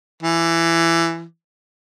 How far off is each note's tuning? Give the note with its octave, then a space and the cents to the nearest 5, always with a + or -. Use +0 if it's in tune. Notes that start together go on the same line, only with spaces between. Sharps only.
E3 +20